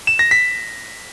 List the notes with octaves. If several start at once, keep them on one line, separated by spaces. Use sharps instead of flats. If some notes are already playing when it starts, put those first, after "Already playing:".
E7
A#6
B6